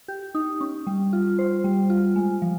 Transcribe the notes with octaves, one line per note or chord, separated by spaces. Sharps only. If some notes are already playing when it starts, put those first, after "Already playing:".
G4
D#4
C#4
G3
F4
C5
G3
F4
G#3
F3